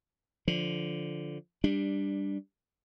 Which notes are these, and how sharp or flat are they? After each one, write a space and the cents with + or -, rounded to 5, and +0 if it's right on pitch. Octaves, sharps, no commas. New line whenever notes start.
D3 -10 F3 +0
G3 +10 D4 +0